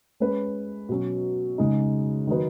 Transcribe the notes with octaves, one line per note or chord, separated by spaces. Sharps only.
G#3 C#4 B4
B2 F#3 C#4
C#3 G#3 D#4 G#4
D#3 F#3 D#4 B4